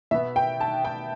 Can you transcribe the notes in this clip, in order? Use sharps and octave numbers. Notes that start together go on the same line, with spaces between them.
B2 B3 E5
G5
A5
G5